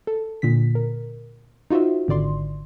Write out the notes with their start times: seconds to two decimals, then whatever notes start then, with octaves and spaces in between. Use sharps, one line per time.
0.07 A4
0.42 A#2 D3 B6
0.75 A#4
1.70 D#4 F4 F#4 C5 E5
2.08 G#1 D3 D5 C6